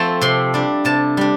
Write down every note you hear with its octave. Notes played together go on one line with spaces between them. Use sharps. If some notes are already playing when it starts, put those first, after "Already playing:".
Already playing: F3 A3 C4 A5
C3 C6
G3 D4
C3 A5
G3 D4